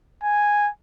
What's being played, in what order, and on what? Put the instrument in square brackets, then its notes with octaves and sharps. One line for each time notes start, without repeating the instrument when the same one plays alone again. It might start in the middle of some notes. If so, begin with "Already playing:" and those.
[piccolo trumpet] G#5